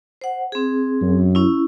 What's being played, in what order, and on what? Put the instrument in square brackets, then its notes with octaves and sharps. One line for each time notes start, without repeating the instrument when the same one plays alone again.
[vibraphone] C5 F#5
C4 G#4
[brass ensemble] F#2
[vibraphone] C#4 E4